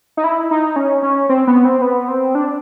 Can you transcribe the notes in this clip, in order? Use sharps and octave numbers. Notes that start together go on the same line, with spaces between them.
D#4
E4
D#4
C#4
C#4
C4
B3
C4
B3
C4
D4